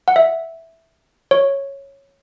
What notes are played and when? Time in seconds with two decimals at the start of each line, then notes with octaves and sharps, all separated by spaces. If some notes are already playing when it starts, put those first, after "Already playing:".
0.08 F#5
0.16 E5
1.31 C#5